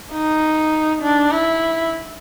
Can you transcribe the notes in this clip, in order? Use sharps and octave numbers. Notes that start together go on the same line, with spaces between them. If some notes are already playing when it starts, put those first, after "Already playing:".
D#4
D4
E4